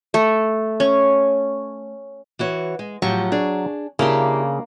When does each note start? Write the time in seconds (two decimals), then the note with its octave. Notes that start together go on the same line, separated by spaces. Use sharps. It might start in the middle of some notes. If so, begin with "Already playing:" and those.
0.14 A3
0.80 C#4
2.39 E3 F#4 C#5
2.79 G#3
3.02 A2 F3 F#3 G4 C#6
3.32 D4 G#4
3.99 C#3 A#3 D4 E4 G4 C6